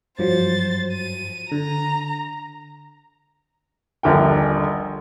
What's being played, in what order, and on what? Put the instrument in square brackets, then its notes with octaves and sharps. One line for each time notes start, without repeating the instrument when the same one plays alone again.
[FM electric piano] G2 F3 F#3 [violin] C5 A6
[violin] D#7
[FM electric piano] D3 [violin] A#5
[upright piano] D#1 A#1 D3 A#4 G5